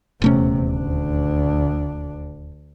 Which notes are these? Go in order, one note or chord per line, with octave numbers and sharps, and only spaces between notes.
D#1 E2 C3 A3 C#4
D2 D4